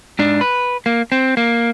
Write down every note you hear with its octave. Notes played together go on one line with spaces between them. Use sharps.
G#2 D4
B4
A#3
C4
A#3